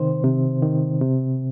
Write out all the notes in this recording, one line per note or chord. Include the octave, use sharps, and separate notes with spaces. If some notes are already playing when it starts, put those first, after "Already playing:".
Already playing: C3 D#3 C5
C3
D#3
C3